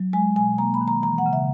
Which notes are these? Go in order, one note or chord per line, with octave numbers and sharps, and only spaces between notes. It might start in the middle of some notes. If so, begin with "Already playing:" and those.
Already playing: F#3
G#3 G#5
B2 G#5
A#3 A#5
B5
D#3
A#5
E3 A#5
F#5
C#3
E5